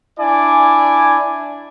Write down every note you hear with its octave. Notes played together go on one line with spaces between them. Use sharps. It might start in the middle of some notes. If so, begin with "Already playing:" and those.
D4 E4 D5 G#5